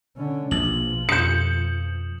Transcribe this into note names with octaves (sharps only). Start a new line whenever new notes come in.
D3 C#4
A#1 B2 F3 F#7
F2 D#6 G6 C#7 E7